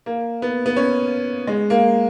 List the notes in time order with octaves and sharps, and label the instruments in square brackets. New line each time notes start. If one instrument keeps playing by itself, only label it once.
[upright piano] A#3
B3
B3
C#4
G#3
A#3